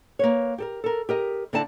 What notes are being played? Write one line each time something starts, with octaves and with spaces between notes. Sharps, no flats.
A#3 B4 C#5
G4 A4 A#4
A4 A#4
G4 A#4 D#5
D3 A#3 C4 E4 D5 A5